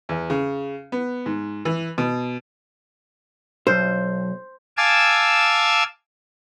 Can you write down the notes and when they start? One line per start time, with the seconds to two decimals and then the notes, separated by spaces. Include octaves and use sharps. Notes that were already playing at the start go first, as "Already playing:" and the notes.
0.09 E2
0.30 C#3
0.92 B3
1.26 G#2
1.65 E3
1.98 B2
3.67 B1 C5
4.77 F5 G#5 A5 D6 E6 G#6